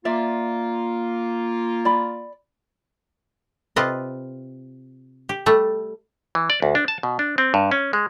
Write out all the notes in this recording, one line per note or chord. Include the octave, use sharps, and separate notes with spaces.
A#3 F4 D5 E5
D5 B5
C3 F4 B4 D#5
G4
G3 A3
E3
D5
D2
D4
A5
B2
D4
C4
G2
C#4
G#3